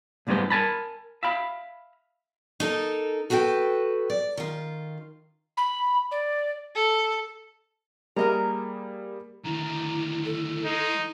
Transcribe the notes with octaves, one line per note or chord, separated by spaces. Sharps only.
B1 G2 G3 G#3 B3 C5
A#4 G#5 A5 B5
E5 F5 B5
D#4 A4 A#4
F#4 A4 B4 F5 G5
D5
D#3 F4
B5
D5
A4
G3 A#3 G#4 A#4 D#5 A#5
D#2 D3 E4 A#5
A4
G#3 D#4